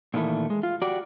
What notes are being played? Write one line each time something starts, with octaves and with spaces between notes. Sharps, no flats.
A#2 D#3 E3 A3
G#3
F4
F#4 G4 D5